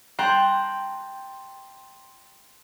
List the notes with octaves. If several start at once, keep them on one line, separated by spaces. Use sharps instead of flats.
G5 A5 A#5 C6 F#6